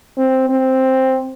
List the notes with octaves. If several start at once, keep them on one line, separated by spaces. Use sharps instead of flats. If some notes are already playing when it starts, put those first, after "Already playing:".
C4
C4